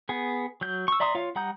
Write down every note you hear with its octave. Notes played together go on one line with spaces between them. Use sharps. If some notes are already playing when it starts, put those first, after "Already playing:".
B3 G#4
F#3 G6
C#6 E6
D5 E5 A#5 C6 D#6
F4 C#5 F5
G3 F#5 A#5 D#6 G6